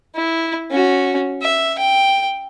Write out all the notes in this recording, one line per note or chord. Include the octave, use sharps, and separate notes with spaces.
E4
C#4 F#4
E5
G5